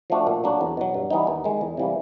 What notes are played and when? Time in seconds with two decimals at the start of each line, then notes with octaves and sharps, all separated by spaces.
0.10 F3 A3 D4 F#4
0.27 A#2
0.44 F#3 A#3 D4 F#4
0.61 E2
0.77 B2 F#3
0.94 G2
1.10 E3 G3 B3 D#4
1.27 D#2
1.44 D#3 G#3
1.61 E2
1.77 C3 E3 G3 A#3